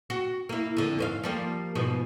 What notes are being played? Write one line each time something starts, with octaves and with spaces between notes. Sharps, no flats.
F#4
A#3 E4
F2 D3
G#2 C5 F5
F3 G3 A#3
G#2 B2 F3